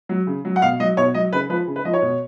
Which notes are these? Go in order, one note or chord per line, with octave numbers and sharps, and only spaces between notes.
F#3
C#3
F#3
F#5
B2 F5
F#3 D#5
B2 C#5
F#3 D#5
C#3 B4
F3 B4
C#3
B4
F3 D#5
C#5
B2